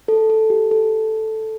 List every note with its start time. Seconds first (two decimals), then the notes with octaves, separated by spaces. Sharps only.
0.08 A4
0.30 A4
0.50 G4
0.71 A4